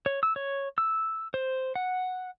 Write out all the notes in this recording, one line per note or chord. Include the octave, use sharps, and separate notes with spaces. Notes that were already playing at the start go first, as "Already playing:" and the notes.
C#5
E6
C#5
E6
C5
F#5